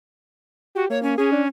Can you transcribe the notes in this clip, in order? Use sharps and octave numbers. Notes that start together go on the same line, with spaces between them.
F#4 G4
A#3 C#5
C#4
C#4 G#4
D4